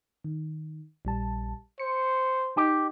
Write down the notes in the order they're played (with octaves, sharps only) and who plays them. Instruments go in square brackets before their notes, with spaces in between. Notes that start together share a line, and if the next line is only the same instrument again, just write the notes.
[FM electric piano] D#3
A#1 G3 A5
[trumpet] C5 [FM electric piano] C#7
[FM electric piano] D#4 [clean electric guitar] G4